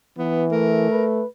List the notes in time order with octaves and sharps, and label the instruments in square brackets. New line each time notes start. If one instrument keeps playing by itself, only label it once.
[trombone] E3 [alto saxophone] B3
[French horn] A3 [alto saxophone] A#4
[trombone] B4